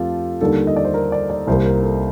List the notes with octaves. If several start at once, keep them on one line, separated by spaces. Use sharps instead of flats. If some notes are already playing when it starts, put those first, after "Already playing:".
Already playing: F2 A3 C4 F4 G4 A4
D#2 D3 G3 A#3 A4
D#5
D5
C5
A#4
D5
D5
C2 C3 G3 A#3 C5
A#4
A4